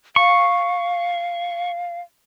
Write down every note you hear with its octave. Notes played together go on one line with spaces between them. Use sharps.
F5 C#6